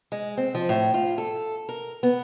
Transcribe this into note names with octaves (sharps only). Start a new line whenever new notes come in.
G#3
C4
F3
A2
F4
A4
A#4
B3